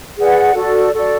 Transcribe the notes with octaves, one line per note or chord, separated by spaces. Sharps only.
G#4 B4 D5 F#5
F#4 A4 D5
F#4 A4 D5